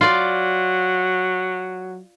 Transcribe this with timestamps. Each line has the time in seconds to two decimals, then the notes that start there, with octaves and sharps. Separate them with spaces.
0.01 F#3 F4 D5